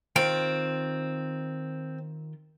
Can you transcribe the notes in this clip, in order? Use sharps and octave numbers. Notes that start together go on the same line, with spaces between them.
D#3 C4 F4 G5